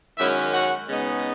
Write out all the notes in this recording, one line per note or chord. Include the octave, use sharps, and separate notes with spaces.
F#2 D#3 G#3 C#4 E4 E5
F#4 F#5
C#3 G#3 B3 D#4